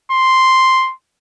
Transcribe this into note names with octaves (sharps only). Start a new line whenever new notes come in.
C6